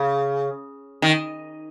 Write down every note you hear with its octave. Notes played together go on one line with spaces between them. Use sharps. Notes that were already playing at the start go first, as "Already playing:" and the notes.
Already playing: C#3
D#3